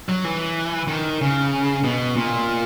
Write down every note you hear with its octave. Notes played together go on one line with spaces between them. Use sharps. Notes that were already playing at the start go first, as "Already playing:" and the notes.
F#3
E3
D#3
C#3
B2
A#2